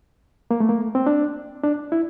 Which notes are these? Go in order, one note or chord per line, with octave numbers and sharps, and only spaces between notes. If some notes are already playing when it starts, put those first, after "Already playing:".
A#3
A3
A#3
C4
D4
D4
E4